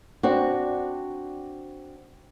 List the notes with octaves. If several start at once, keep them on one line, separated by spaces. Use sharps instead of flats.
C4 D4 F#4